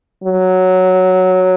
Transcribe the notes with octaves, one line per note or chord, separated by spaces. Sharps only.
F#3